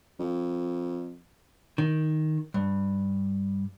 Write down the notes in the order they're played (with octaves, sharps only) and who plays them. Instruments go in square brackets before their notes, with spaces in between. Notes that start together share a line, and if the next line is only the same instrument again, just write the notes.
[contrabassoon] F2
[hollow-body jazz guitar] D#3
G2